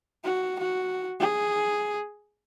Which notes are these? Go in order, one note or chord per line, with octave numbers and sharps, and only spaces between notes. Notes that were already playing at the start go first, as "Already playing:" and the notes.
F#4
F#4
G#4